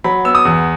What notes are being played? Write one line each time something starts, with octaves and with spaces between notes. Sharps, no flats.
F#3 B5
B3 E6
D#6
E2